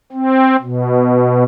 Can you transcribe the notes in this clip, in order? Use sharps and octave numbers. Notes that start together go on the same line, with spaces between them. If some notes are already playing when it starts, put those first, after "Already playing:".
C4
B2